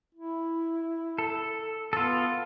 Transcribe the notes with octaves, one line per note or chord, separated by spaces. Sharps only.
E4
A4
B3 F4 A4